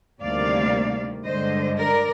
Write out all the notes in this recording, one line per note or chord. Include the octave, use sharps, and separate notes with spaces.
D2 C3 D#3 G3 A#3 D5 F5
G2 D3 G#3 C5 D#5
A#4 D5